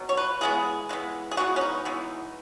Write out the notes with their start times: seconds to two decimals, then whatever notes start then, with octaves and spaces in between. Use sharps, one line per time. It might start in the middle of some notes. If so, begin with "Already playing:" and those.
Already playing: B2 F#3
0.09 C#5
0.17 B4
0.41 E3 G#3 B3 G#4
0.89 E3 G#3 B3
1.31 G#4
1.37 E3 G#3 B3 F#4
1.56 C#4
1.61 D#4
1.85 E3 G#3 B3